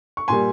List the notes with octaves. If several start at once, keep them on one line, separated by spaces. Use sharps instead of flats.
C#6
A#2 G3 G#5 C6